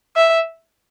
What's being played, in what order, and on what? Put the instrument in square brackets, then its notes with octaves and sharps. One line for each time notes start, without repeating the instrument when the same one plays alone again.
[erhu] E5